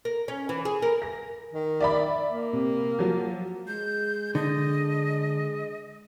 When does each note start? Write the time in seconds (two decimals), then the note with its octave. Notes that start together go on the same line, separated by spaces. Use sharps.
0.05 A#4
0.28 C#4
0.49 E3
0.65 G#4
0.82 A#4
1.02 A#6
1.53 D#3
1.80 D5 E5 B5
2.29 A#3
2.53 C3
2.99 F3 F#3
3.68 G#3 G6
4.35 D3 D#5